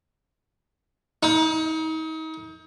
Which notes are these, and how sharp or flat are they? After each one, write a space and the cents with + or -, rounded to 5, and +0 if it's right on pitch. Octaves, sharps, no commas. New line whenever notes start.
D#4 +35